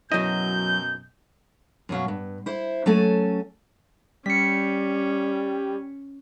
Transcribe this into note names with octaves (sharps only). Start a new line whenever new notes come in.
F#2 B2 F#3 E4 D#5 G6
F#2 B2 F#3 F5
G2
E4 C5
F#3 A3 C#4 A4 G#5
G3 C#4 B6 C#7